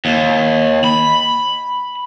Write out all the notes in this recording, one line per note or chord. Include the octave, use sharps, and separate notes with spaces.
D#2
B5